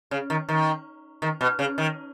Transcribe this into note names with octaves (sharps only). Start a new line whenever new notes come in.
C#3
D#3
D#3
D#3
B2
C#3
D#3